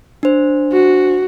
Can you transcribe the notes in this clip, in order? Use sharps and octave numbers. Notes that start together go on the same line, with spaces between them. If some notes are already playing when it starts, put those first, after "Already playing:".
D4 C5
F#4